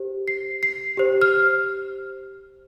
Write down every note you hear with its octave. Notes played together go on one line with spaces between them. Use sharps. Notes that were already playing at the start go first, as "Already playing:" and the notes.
Already playing: G4 C5
C7
C7
G4 C5
F6